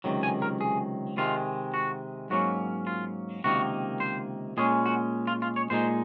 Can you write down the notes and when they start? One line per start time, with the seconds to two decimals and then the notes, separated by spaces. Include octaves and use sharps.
0.04 C#2 C3 D#3 F#3
0.23 G#5
0.42 A#4
0.61 G#4
1.17 C3 D#3 G#3 F4
1.74 F#4
2.30 G#2 F#3 A#3 C#4 F#4
2.87 F4
3.44 C#2 C3 D#3 A#3 D#4 F#4
4.00 C5
4.57 A#2 G#3 C#4 G#4
4.86 F#4
5.27 F4
5.42 F4
5.56 C#5
5.70 A#2 G#3 D#4 C5